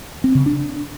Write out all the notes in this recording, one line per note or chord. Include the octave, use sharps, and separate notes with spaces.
C4
C#3
D4